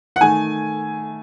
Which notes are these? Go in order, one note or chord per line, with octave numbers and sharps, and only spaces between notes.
F#5
D#3 A3 G#5